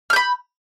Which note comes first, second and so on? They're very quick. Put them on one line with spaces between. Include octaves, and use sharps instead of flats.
F6 G6 B5